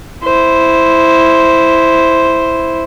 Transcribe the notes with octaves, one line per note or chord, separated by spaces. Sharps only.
E4 C5